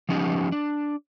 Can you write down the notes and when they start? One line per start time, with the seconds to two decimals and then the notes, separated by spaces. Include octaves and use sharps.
0.09 F3 B3 C#4 D#4 G4
0.52 D4